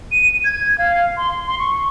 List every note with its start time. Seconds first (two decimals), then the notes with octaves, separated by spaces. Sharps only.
0.12 D#7
0.44 G#6
0.78 F5
1.17 C6
1.47 C6
1.59 C#6